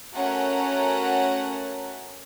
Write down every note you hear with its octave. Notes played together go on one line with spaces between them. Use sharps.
A3 C#4 F#4 A#4 F#5